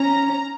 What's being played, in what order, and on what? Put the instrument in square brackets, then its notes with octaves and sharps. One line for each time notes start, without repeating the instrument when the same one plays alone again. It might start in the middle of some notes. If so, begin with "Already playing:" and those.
Already playing: [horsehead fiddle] C#4 [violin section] A#5